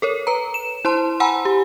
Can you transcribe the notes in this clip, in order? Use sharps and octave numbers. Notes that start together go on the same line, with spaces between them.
A4 A#4 C#5
B4 A#5
E7
E4 C5 A5 C6
F#5 G#5 A#5 B5 E6
G4